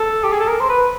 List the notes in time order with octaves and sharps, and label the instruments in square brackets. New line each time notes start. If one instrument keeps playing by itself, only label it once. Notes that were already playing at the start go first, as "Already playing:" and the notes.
Already playing: [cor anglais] A4
G4
G#4
A4
A#4
C5
B4